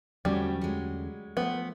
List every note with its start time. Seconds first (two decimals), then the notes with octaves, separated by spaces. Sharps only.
0.25 E2 D3 F#3 G3 A3 C4 C#4
0.61 F#3 G#3
1.37 F3 A3 B3